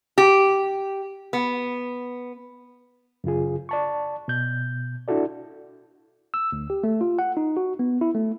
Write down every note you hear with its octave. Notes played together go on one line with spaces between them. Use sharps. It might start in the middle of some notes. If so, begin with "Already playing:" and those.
G4
B3
F#2 C#3 F4 G#4
D5 A5 C#6
B2 G6
D4 E4 F#4 A4 D5
E6
D2
G4
A3
F4
F#5
D#4
F#4
B3
E4
A3